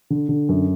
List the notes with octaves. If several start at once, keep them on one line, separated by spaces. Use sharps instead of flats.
D3
D3
F#2